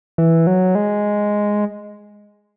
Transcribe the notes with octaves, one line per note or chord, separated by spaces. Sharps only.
E3
F#3
G#3